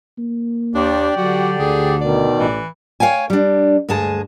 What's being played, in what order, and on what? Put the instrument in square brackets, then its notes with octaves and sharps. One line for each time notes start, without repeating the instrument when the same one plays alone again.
[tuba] A#3
[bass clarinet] D#2 [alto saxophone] D4 [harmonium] G4 D5
[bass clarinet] D3 [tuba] F#3 [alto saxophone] F#4
[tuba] D2 [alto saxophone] G#4
[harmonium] B2 D#3 [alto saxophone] D5
[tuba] A1 [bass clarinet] E3
[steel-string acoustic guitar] C#5 F5 G5 G#5
G3 D4
D2 G2 G#3 G#4 A5